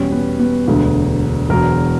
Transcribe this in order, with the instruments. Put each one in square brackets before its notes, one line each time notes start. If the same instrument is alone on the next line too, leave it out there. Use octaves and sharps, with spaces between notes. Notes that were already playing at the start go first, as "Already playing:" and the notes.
Already playing: [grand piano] E2 B2 G3 C#4
B3
B3
E1 D2 D3 F#3
E1 E2 B2 F#3 A#4